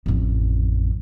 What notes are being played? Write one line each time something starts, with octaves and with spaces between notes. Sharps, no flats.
A1 F2